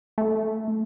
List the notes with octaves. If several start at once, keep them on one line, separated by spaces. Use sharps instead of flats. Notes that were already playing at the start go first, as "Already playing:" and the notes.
A3